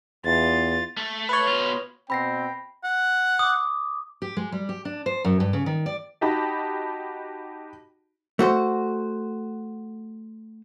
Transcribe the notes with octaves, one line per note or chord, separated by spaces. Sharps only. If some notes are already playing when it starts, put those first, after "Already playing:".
E2 F4 A6
A3
B4 C#5
B2 F4
B2 C4 G5 B5 A#6 C7
F#5
D6 D#6
G4
G#3
G3
G4
D4
C5
F#2
G2
C#3
D#3
D5
D#4 F#4 G4 D#5 A5 B5
A3 F#4 C5